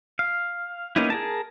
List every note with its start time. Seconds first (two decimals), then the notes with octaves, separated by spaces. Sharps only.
0.19 F5
0.96 A#3 B3 C#4 D#4 E4
1.10 G#4 A#4 A5